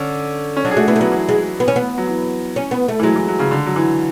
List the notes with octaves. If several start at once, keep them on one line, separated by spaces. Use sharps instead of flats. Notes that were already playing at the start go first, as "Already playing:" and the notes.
Already playing: D3 C#4
C#4
F#3 D4
G#4
A3 F#4
B3 E4
A3
F#3 B3
E3
G#3
B3
C#4
B3
F#3
E3
C#4
B3
A3
E3
F#3 G#3
E3
F#3
C#3
D3
F#3
E3